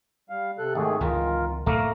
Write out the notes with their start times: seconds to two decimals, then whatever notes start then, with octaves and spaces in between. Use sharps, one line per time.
0.30 G3 F5
0.58 C3 A4 F#6
0.75 G#1 D#3 A3 G#4
1.01 C#2 D#3 E3 F4 A#4
1.66 F2 A2 D3 A3 A#3 A#4 A#5